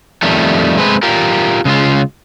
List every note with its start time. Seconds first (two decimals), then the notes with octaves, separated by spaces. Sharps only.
0.23 F2 D#3 G3 A3
0.78 G#3 A3 C4 B4
1.03 F4 G4 A#4
1.65 C#3 G#3 F4